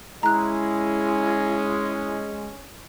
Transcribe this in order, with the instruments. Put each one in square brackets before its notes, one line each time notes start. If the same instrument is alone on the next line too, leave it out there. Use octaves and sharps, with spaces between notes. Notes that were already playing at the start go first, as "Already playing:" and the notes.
[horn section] G#3 [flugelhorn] C#4 [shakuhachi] E4 [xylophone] A#5 F#6